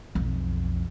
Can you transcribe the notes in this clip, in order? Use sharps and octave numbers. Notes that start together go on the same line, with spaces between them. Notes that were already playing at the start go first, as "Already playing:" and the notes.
B1 F2